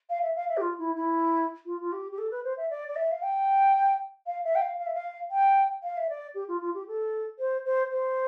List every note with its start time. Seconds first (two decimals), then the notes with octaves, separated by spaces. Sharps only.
0.09 F5
0.22 E5
0.35 F5
0.49 E5
0.57 G4
0.61 F4
0.78 E4
0.96 E4
1.65 F4
1.80 F4
1.92 G4
2.11 G4
2.18 A4
2.31 B4
2.44 C5
2.57 E5
2.70 D5
2.88 D5
2.96 E5
3.11 F5
3.22 G5
4.26 F5
4.44 E5
4.55 G5
4.61 F5
4.78 F5
4.86 E5
4.94 F5
5.30 G5
5.83 F5
5.97 E5
6.09 D5
6.34 G4
6.48 F4
6.61 F4
6.74 G4
6.87 A4
7.39 C5
7.64 C5
7.90 C5